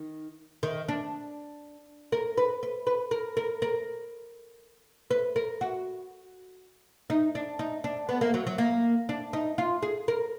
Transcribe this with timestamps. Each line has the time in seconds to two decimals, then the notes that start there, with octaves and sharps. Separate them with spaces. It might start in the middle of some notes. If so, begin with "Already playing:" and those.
Already playing: D#3
0.63 D#3
0.88 D4
2.12 A#4
2.37 B4
2.63 B4
2.87 B4
3.11 A#4
3.37 A#4
3.62 A#4
5.11 B4
5.36 A#4
5.61 F#4
7.10 D#4
7.35 D4
7.59 D#4
7.84 D4
8.09 B3
8.21 A#3
8.34 F#3
8.47 F#3
8.58 A#3
9.09 D4
9.33 D#4
9.58 F4
9.82 G#4
10.08 A#4